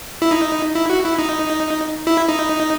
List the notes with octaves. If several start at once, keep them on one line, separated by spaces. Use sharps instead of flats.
E4
D#4
E4
F#4
E4
D#4
E4
D#4